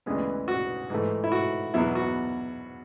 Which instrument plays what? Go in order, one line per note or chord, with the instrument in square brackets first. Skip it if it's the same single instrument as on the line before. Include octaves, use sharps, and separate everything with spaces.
[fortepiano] D2 C#3 E3 G#3 B3
F#4
G#2 E3 A3
E4
F#4
E2 B2 F#3 B3 E4
F#4